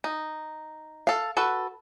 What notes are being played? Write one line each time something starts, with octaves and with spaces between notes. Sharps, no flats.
D#4
A4 F5
F#4 A4 B4